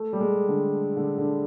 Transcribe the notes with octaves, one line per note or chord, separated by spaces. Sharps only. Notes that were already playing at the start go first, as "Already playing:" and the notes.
Already playing: A3
G3
G#3
D3
D3
D3